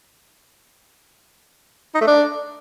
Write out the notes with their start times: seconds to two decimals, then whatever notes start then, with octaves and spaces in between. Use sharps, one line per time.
1.95 D#4
2.01 A3
2.07 D4